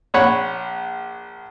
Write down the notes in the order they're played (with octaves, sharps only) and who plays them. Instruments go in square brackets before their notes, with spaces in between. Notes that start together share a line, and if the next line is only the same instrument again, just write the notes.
[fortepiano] A#1 C#5 F#5 B5